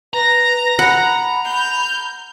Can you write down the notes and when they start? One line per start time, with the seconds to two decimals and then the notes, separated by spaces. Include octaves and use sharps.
0.14 B4 A#5 A#6
0.79 F#5 B5
1.44 F6 G6